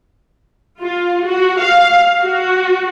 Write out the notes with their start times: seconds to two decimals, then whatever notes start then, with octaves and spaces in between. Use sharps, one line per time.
0.81 F4
1.25 F#4
1.61 F5
2.22 F#4